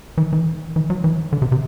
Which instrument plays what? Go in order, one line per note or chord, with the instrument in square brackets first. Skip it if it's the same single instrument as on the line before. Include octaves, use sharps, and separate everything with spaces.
[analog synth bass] E3
E3
E3
F#3
E3
D3
C3
C3